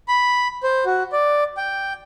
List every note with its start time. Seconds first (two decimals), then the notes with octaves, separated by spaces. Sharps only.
0.08 B5
0.63 C5
0.85 F#4
1.12 D5
1.57 G5